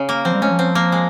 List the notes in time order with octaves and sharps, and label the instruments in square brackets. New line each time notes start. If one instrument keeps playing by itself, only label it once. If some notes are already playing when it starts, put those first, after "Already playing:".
Already playing: [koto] C#3
A#3
[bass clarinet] F3 [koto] C4
[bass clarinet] G3
[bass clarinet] G#3 [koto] C#4
[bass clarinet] F3
[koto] C4
A#3
G#3